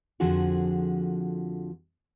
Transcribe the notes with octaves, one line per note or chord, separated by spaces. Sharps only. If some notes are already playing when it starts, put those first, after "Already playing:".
F2 D3 F3 F#4 G#4